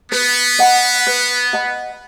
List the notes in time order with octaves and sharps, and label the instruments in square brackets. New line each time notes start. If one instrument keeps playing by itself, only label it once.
[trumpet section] B3 [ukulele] B4
[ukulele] D#5 F#5 B5
B4
D#5 F#5 B5